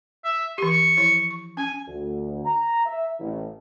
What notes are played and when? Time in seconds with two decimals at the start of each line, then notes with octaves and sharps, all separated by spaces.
0.24 E5
0.58 E3 G4 C#6
0.97 F3 E4 C#5
1.31 C#6
1.57 C#4 G#5
1.87 D2
2.45 A#5
2.86 E5
3.19 A1